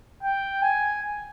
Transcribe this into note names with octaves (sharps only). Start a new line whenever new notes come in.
G5
G#5